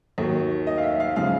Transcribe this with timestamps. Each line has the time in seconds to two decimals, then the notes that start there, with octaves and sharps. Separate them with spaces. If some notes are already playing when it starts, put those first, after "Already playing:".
0.18 D#2 D#3 F#3
0.67 D#5
0.78 F5
0.83 E5
1.00 F5
1.16 C#3 F3 G#3 F5